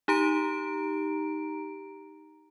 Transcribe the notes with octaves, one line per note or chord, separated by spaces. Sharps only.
D#4 G4 A#5 D7